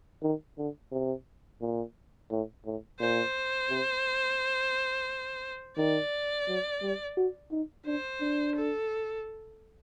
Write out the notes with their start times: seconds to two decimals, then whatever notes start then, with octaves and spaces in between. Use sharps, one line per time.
0.23 D#3
0.58 D3
0.92 C3
1.61 A#2
2.31 A2
2.66 A2
3.00 A#2 C5
3.70 C3
5.77 D#3 D5
6.47 F#3
6.82 G3
7.17 F#4
7.51 D#4
7.86 D4 C5
8.21 D4
8.56 A4